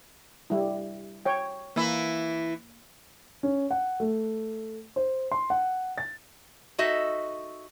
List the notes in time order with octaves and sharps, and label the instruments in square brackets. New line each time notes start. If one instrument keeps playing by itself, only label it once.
[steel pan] G3 E4
C#5 G5
[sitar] E3 E4 [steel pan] A#3
[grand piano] C#4
F#5
A3
C5
C6
F#5
A6
[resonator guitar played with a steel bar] D#4 F#4 A4 D#5 E5